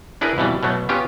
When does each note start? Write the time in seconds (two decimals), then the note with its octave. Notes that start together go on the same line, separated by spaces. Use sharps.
0.21 D4 E4 G#4 A#4 B4
0.37 F2 B2 E3 G3
0.63 B2 F#3 A3
0.89 B3 C#4 F4 G4